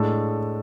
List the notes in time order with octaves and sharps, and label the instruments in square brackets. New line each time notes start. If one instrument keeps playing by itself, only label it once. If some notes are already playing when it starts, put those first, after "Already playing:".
Already playing: [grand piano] A2 G#3 D4 A4